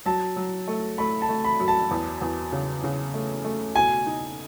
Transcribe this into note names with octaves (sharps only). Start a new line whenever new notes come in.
F#3 A5
F#3
A3
A3 B5
A5
A3
B5
F#2
A5
E2
E2
C#3
C#3
A3
A3
B2 G#5
D#4